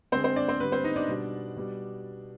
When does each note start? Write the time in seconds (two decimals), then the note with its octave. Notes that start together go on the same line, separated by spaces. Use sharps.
0.12 D3 G#3 C4 C5
0.24 C4 C5
0.36 D4 D5
0.48 C4 C5
0.60 D3 G3 B4
0.72 C4 C5
0.84 D#4 D#5
0.96 D4 D5
1.08 B2 G3
1.56 B2 G3